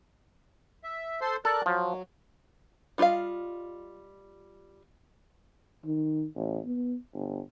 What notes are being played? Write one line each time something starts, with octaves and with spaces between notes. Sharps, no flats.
E5
A4 C5 C6
A4 A#4 D5 F#6
F3 F#3
G3 F4 B4 D#5 F5
D#3
A1
B3
G1